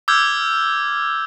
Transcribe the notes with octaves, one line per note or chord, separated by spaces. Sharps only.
D6 E6 F6 G6 G#6 G7